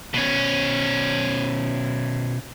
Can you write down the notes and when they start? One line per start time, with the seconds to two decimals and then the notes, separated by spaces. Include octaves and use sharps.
0.14 B2 C#4